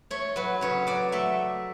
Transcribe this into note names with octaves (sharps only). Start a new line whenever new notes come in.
A3 C#5
F#3 B4
C#3 C#5
F#3 D5
A3 E5